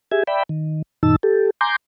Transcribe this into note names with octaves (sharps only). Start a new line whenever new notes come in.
G4 G#4 E5 G#5
D5 E5 G5 B5
D#3
F#2 A#2 D#3 D#4 A5 E6
G4 A4
G#5 A#5 C6 D6 G6